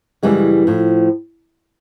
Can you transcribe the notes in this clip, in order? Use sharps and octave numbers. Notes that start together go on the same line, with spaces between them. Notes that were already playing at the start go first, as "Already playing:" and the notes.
F#2 C#3 E3 G3 G#3
A2 F3